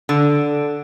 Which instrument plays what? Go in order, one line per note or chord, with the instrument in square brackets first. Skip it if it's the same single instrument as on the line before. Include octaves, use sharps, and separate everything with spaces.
[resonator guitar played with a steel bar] D3